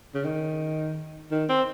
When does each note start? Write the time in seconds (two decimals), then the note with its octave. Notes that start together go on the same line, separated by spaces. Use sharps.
0.14 C#3
0.24 D#3
1.31 D#3
1.49 C4